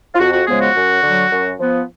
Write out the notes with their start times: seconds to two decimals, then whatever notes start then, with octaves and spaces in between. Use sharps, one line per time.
0.15 F4
0.19 F2 F#4
0.33 F#4
0.47 C#3 F3 G#3 B3 G#4
0.61 F#4
0.75 F#2
1.03 D3 F#3
1.31 F#2
1.60 F3 B3